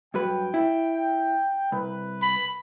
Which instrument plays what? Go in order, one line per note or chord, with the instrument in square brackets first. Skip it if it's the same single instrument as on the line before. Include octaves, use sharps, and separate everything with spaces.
[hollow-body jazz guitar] G2 F#3 B4 [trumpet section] G5
[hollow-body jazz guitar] E4
[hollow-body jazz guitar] C2 [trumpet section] B4
[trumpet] B5